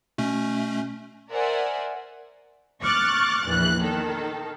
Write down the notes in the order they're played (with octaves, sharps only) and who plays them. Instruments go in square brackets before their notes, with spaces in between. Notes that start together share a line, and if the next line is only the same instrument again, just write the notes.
[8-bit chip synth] B2 A3 C#4
[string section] A#4 C5 D5 E5 F#5 G#5
C#6 D6 F6 F#6 A6
A#1 E2 E3 F#6
D#3 A4